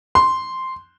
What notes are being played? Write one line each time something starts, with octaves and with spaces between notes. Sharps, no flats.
C6